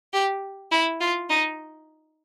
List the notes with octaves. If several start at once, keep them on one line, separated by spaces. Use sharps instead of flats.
G4
E4
F4
D#4